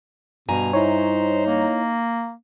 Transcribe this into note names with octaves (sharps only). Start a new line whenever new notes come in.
G2 B2 G#5 A#5
D#4 E4 C5 C#5
A#3